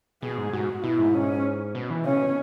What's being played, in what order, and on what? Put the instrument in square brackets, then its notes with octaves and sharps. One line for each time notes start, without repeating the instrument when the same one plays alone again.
[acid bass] B2 [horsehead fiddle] G#4
[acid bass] G#2
[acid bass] G#2 [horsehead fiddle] F#4
[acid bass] B2 [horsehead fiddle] E4
[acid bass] G#2
[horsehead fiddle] C#4
[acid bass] B2
E3
[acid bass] C#3 [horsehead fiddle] C#4
[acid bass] B2